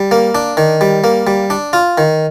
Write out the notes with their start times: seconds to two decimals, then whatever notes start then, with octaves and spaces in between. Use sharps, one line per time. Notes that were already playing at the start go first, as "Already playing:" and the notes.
Already playing: G3
0.11 A#3
0.35 D4
0.57 D#3
0.81 G3
1.04 A#3
1.27 G3
1.50 D4
1.73 F4
1.98 D#3